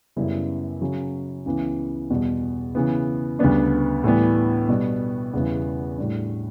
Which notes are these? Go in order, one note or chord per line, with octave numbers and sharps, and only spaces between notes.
F#2 C#3 G3 B3 E4
C#3 F#3 C#4
C#2 C#3 E3 B3
E2 B2 G3
C#3 E3 B3
D2 C#3 G3 B3 D4
A2 E3 G3 B3
B2 G3 B3
E2 C#3 G3 B3 E4
A2 G3 D4